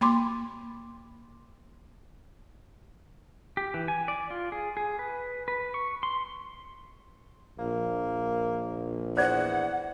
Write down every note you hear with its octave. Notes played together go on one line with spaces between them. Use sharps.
A#3 B5 C6 D6
G4
E3
G#5
D5
F4
G#4
G#4
B4
B4
C#6
C6
A#1 A#3
E2 C5 D5 F#5